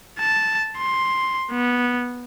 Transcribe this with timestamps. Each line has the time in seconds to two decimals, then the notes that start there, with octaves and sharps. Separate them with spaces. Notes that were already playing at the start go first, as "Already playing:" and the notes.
0.19 A5
0.78 C6
1.51 B3